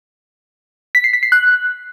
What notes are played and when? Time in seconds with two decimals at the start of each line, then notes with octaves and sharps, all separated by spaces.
0.95 B6
1.04 C7
1.13 B6
1.23 C7
1.32 F#6